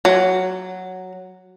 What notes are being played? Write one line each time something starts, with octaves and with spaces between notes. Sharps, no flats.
F#3